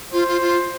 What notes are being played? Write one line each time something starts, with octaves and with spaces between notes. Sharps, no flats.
F4 C5
F4
F4